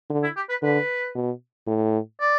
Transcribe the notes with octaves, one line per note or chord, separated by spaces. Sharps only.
D3
E4
G4
B4
D3 B4
B2
A2
D5